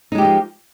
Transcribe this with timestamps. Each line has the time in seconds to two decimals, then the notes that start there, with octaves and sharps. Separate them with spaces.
0.12 D#4
0.15 G#3
0.18 G4
0.21 E3
0.25 F3